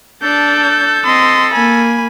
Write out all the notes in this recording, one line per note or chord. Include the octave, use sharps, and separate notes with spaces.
D4 A4 A5 G6
C4 D#5 C6
A#3 G#5 B5